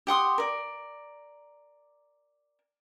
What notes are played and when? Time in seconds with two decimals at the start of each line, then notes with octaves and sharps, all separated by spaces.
0.07 G4 F#5 C6 D#6
0.38 A#4 D5